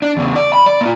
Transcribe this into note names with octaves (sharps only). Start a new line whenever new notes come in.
D4
E2 C#3
D5
B5
D5
A#3 F4